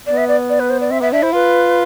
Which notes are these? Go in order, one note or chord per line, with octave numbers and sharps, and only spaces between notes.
B3 D5
E5
D5
D5
B4
C5
D5
C4 E5
B3 E5
D4 E5
E4 C5
F4 B4